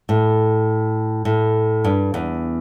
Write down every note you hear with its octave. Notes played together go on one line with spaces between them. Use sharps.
A2
A2
G2
E2